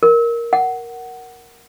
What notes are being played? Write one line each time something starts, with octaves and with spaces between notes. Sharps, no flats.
A#4
F#5